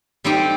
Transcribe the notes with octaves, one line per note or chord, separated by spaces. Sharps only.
G3 C4 D#4 G4